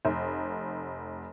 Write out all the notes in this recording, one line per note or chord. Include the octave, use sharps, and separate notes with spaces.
F1